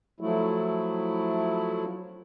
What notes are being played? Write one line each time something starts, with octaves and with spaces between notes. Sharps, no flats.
F3 F#3 A3 E4